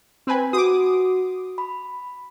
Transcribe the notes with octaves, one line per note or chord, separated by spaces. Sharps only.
C4 B4 G#5
F#4 D6 D#6
B5